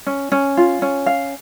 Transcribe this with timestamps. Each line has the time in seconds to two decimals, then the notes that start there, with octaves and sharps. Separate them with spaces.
0.06 C#4
0.32 C#4
0.57 F4
0.82 C#4
1.06 F5